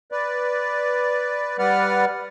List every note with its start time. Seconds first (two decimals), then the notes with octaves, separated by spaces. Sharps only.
0.12 B4 D5
1.59 G3 B4 D5 F#5 F6